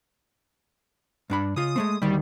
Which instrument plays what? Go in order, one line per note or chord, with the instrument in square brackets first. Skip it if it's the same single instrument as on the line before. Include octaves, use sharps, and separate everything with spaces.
[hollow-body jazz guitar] G2 D4 B5
[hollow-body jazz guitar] C#3 F4 [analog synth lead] D#6
[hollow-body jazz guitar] G#3 A3 C4
[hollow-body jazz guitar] D2 D#3 [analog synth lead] G3